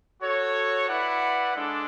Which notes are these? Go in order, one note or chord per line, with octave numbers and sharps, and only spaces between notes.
F#4 A4 C#5
E4 B4 D5 F#5
G#3 D4 A4 D5